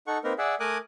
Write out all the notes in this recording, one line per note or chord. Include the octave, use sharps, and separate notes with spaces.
D#4 A4 F#5 C#6
A#3 C4 D#4 A#4 B4
G#4 D5 E5 F#5
A3 A#4 G#5 D6 D#6 F#6